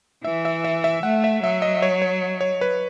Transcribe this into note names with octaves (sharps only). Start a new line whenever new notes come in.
E3 E5
E5
E5
E5
A3 F#5
E5
F#3 E5
D#5
C#5
C#5
C#5
B4